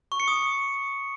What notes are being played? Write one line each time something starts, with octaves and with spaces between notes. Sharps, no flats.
C#6
C#7
D#6